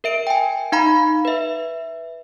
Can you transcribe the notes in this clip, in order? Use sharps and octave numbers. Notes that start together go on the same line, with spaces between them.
A#4 E5 D7
G5 G#5
D#4 F5 A#5 B5
B4 E5